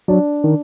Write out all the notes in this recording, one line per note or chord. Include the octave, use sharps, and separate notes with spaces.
F#3 D4
D#3